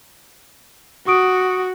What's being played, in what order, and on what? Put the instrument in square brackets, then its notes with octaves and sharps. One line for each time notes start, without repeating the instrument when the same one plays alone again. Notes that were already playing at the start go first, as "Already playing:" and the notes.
[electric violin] F#4 [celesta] C#6 D#6 D7